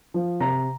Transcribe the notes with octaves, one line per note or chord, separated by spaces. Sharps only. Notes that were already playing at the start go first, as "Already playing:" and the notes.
F3
C3 A#5